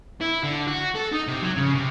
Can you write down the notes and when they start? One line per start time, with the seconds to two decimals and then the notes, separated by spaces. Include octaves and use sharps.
0.21 E4
0.43 D3
0.67 F#4
0.95 A4
1.13 D#4
1.27 C3
1.42 F#3
1.57 C#3
1.75 C3